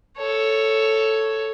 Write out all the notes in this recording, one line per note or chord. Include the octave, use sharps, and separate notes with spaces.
A4 C#5